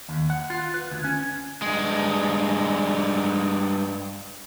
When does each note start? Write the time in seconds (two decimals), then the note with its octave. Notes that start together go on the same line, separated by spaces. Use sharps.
0.09 D#2
0.30 F#5
0.50 F4
0.74 B4
0.91 D2
1.04 C#4
1.62 G2 G#3